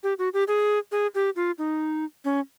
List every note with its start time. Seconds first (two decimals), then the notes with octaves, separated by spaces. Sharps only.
0.03 G4
0.19 F#4
0.34 G4
0.48 G#4
0.92 G#4
1.15 G4
1.36 F4
1.58 D#4
2.25 C#4